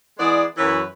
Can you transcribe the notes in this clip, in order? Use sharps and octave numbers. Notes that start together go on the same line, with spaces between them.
E3 G#3 B3 G#4 D5
F#2 E3 F#3 E4 B4 C#5